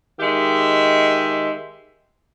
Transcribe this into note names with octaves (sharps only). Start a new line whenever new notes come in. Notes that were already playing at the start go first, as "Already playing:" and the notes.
D#3 G#3 G4 E5